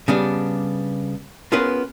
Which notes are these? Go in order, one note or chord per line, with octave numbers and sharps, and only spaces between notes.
C#3 G3 B3 D4
B3 C#4 F4 G#4 A#4 B4